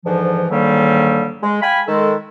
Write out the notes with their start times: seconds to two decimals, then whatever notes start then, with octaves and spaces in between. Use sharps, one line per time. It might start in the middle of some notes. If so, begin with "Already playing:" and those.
0.06 G#2 D3 E3 F3
0.50 G#2 D3 D#3 F#3 G3 A#3
1.43 G#3
1.62 F5 G5 G#5 B5
1.88 D#3 G#3 A4